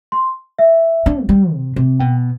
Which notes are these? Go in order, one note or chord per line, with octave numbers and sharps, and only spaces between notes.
C6
E5
D4
F3
G3
C3
C3
B2 G5